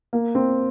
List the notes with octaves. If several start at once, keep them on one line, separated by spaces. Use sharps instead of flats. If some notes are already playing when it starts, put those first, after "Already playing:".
A#3
C4